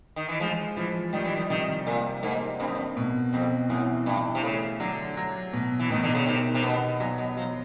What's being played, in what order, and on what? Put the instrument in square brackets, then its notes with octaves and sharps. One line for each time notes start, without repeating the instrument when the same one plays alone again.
[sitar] D#3
E3
[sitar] F3 [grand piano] G#3
[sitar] E3 [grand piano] F3
[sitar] D#3 [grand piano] G3
[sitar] E3
D#3
[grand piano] C3 [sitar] D#3
[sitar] A#2 [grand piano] A#3
[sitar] G#2 [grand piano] A#3
[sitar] G2 [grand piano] C4
[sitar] F#2
G2
[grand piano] B2
[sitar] F2 [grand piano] C4
[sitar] F#2 [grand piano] E3
[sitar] G2 [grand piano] E3
[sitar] C3
[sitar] C#3 [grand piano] A3
[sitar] D3 [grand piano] F#3
[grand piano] F#3
B2
[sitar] E3
[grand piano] B2 [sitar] D#3
[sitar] D3
C#3
[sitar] C3 [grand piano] D#3
[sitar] C3
[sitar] B2 [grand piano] B3
[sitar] A#2 [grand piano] F#3
[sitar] B2
[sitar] F3 [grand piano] F#3